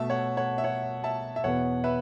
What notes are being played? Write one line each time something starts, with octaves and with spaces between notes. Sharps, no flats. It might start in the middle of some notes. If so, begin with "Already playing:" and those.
Already playing: B2 A3 E5 A5
C#5 F#5
C#5 F#5
E5
C#5 F#5
E5 A5
E5
E2 B2 B3 C#5 F#5
B4 E5